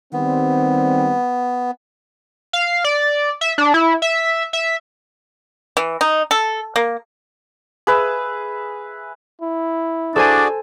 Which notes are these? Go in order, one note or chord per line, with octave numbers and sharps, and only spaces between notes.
D#3 G3 B3 C4
F5
D5
E5
D4
E4
E5
E5
E3
D#4
A4
A#3
G#4 B4 E5
E4
D4 F#4 G#4 A4 C5 D5 G#5